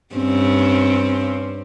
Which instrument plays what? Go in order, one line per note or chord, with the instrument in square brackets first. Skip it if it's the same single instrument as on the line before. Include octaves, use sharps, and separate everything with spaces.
[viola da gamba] G2 C4 C#4